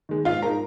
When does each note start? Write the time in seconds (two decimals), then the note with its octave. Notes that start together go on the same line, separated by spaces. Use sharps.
0.09 D#3 G#3
0.25 G#2 F4 F5
0.42 G#3 D#4 A#4 A#5